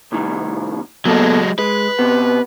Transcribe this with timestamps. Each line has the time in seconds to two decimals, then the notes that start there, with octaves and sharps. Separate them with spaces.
0.12 C2 A2 D#3
1.06 B2 F#3 G#3 A#3 A4
1.59 G#3 B4
1.99 C3 B3